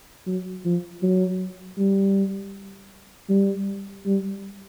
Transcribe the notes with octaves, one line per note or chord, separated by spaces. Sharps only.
F#3
F3
F#3
G3
G3
G3